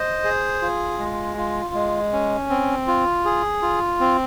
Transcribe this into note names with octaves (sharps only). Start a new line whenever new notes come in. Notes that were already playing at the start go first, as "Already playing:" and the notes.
Already playing: C5 D#5
G#4
F4
G#3
F4
G#3
C#4
C4
F4
G#4
F4
C4